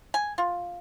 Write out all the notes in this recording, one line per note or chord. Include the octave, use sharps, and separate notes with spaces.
G#5
F4